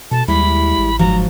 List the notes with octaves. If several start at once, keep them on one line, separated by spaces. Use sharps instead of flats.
B2 A4 A5
D#2 G3 G#3 E4 B5
A1
G1 G#2 F3 F#3 A#5